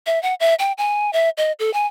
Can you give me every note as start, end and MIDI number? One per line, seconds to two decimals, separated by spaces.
0.06 0.21 76
0.23 0.34 78
0.40 0.54 76
0.59 0.72 79
0.78 1.11 80
1.13 1.30 76
1.37 1.52 75
1.60 1.72 69
1.73 1.87 80